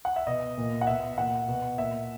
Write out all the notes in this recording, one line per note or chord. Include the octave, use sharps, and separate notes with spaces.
F#5
E5
B2 D#5
A#2
F#5
B2 E5
A#2 F#5
B2
A#2 E5